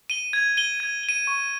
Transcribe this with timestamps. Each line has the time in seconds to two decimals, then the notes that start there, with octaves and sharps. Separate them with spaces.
0.10 D#7 G7
0.33 G#6
0.57 D#7 G7
0.80 G#6
1.03 G7
1.09 D#7
1.27 C#6